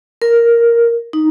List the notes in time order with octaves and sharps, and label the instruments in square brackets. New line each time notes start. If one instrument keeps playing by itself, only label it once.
[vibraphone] A#4
D#4